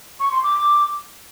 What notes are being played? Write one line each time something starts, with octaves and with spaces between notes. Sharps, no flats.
C#6
C6
D6